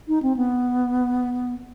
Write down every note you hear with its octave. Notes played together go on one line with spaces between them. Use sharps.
D#4
C4
B3